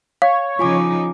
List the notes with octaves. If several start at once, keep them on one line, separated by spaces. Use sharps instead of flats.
C#5 F5
C#3 F3 D#4 F4 G#5 D6